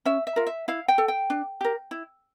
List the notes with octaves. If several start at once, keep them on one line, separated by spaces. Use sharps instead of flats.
C#4 E5
E5
F4 A#4
E5
E4 F5
G5
A4
G5
D4
G4 A#4
E4